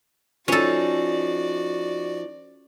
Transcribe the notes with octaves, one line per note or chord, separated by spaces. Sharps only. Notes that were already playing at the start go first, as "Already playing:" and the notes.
F3 C#4 D#4 F#4 A4 D5